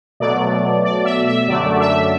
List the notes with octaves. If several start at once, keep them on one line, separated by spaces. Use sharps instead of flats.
B2 F#3 A3 D5
D5
E5
E5
F#2 D3 F#3 A3 D5
E5